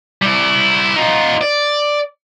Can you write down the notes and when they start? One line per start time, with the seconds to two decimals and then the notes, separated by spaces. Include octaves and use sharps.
0.22 G3 E4
0.96 D#4 F4
1.41 D5